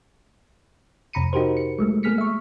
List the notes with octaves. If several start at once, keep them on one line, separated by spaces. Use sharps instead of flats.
F2 C3 A#5 B5 C#7 D#7
D#4 F#4 G4 A#4 C5
C#7
F#3 G#3 A3
A3 A#3 G#4 F6 B6 C#7
E5 C#6